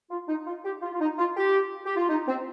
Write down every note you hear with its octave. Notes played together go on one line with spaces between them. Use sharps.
F4
D#4
F4
G4
F4
F4
D#4
F4
G4
G4
F4
D#4
C4